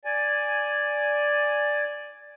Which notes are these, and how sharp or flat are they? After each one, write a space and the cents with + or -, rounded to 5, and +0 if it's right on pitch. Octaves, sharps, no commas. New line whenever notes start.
D5 +0 G#5 +0